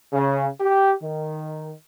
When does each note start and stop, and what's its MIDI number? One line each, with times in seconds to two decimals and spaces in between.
0.13 0.47 49
0.60 0.93 67
1.03 1.71 51